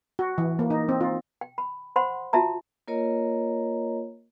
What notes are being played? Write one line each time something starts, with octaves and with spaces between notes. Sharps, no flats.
F#4
E3
A#3
D#4
C4
F4
G5
B5
C5 F#5 B5 C6
F4 F#4 E5 A5 A#5
A#3 F4 A#4 C#5 D#5 A#5